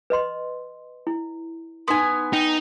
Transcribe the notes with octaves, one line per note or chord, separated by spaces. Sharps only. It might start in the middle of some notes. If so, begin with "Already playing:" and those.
B4 D#5 C6
E4
B3 D#4 G#5 C6
D#4 G5